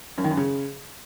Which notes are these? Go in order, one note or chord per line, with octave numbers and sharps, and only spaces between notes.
F#2
D#3
F#2
C#3